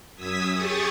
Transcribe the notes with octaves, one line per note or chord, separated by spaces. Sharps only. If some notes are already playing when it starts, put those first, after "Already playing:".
F#2 D#6 E6 G#6 B6
G4 G#4 C#6 D#6 A6